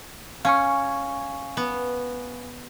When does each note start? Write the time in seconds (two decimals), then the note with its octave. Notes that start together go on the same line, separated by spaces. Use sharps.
0.45 C#4 F5 G#5 C#6
1.57 B3